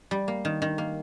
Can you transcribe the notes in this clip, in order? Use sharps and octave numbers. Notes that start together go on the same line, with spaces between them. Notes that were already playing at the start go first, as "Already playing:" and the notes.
G3
A#3
D#3
D#3
A#3